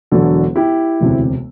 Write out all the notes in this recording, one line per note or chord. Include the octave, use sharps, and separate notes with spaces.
E1 E2 D3 F#3 F#4 A4
E4 G4
E1 D2 C3